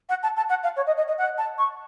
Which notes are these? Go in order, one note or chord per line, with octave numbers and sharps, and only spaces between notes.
F#5
A5
A5
F#5
F5
C#5
D#5
D#5
D#5
F#5
A5
C#6